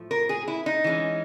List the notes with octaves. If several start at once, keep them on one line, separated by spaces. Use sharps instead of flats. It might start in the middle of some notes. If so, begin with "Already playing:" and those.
Already playing: A2 F3 A3
A#4
G#4
E4
D#4
E3 G#3 C#4